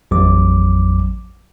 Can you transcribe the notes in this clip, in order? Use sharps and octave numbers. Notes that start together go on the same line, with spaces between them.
A1 F2 F#3 D6